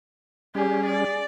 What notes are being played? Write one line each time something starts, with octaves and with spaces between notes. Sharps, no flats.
G3 C#4 G4 G#4
D5